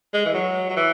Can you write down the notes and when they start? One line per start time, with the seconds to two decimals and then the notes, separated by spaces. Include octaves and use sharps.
0.13 G#3
0.25 E3
0.34 F#3
0.70 F#3
0.76 E3